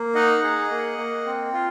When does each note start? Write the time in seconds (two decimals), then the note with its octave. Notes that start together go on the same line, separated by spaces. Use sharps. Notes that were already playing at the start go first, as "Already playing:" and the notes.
Already playing: A#3
0.15 D#4 D#5 F#5
0.43 G#4
0.70 A#3
0.98 A#3
1.26 C4
1.53 F4